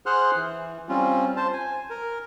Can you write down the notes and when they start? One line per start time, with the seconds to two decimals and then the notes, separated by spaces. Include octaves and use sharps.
0.06 G#4 C5 F#5 C6 F6 F#6
0.35 E3
0.89 G3 C4 C#4 F4
1.36 C5 A5
1.53 G#5
1.90 A#4